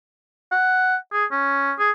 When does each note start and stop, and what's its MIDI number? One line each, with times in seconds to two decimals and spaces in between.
0.52 0.96 78
1.12 1.25 68
1.31 1.73 61
1.79 1.91 68